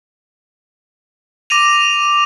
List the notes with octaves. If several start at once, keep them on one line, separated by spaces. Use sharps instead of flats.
D6 A#6 D#7 F7